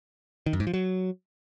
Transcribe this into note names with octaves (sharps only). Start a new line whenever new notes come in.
D#3
F#2
G#2
F3
F#3